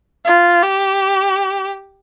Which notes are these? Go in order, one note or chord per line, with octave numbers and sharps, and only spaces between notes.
F4
G4